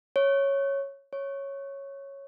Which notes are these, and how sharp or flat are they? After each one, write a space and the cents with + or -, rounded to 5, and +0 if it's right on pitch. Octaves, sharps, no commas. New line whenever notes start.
C#5 -5
C#5 -5